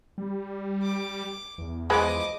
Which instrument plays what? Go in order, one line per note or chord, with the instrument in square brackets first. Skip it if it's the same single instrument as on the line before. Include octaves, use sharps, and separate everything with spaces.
[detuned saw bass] G3
[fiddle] D6
[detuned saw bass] E2
[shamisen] F3 G#3 B4 [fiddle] D#5 D6